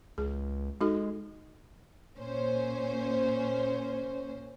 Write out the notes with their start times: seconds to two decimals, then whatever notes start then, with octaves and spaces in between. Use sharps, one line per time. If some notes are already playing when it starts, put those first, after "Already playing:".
0.18 C#2 G#4
0.81 G#3 D#4 F#4 A4
2.18 A#2 C#4 C5